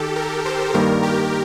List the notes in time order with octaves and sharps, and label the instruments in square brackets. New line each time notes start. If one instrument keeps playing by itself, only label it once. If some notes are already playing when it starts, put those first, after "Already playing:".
Already playing: [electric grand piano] D#3 [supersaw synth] G4 A4
[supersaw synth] A#4
C5
[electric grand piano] G2 D#3 G3 A#3 [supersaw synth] A#4
[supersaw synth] G4